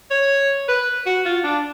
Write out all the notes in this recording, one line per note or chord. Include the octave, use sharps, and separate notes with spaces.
C#5
B4
F#4
F4
D4